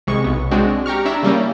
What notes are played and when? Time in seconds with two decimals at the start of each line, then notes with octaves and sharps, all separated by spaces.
0.07 C2 G#3 C#6
0.24 B1 B3
0.51 G#3 C4 D4 F#4
0.86 G4 A#5 C#6 F6
1.05 D4 E4 E5 A#5
1.23 C#3 G3 A#3 C#4